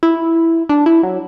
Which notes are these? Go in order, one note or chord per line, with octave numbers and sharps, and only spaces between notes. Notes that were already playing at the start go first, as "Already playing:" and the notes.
E4
D4
E4
F#3